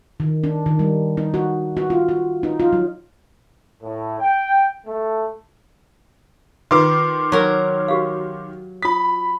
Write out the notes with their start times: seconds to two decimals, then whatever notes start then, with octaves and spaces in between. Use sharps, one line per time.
0.20 D#3
0.44 D4
0.66 D#3
0.79 G3
1.17 D#4
1.34 F#4
1.77 F#4
1.90 F4
2.09 F#4
2.43 D#4
2.60 F4
2.73 F#3
3.82 A2
4.20 G5
4.86 A3
6.71 D#3 F4 B4 C6 D6 E6
7.32 F#3 A#4
7.88 F#4 G4 F5
8.83 F4 B5 D#6 B6